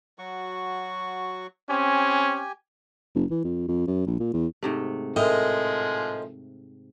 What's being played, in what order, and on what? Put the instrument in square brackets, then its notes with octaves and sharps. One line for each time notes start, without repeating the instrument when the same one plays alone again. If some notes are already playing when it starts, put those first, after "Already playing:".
[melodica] F#3 F#4 C#6
[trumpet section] C4 C#4 [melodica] G4 G#5
[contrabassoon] F#1
E3
F2
F2
F#2
A#1
A#2
E2
[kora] G#2 C3 A3
[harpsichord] A2 [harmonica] F3 G#3 G#4 [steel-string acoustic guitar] A#4 D#5